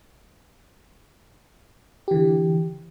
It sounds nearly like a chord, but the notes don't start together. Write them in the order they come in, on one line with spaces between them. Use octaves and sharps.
G4 E3 D3